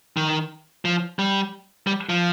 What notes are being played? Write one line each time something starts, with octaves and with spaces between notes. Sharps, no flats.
D#3
F3
G3
G3
F3